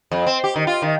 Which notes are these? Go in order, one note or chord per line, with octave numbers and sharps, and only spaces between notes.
F2
C4
G4
D#3
F4
D#3